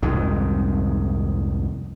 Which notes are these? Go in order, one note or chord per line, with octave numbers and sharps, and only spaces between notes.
C2 F2 G#2 D#3